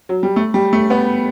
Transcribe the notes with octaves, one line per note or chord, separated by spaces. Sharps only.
F#3
G3
A3
G3
A3
B3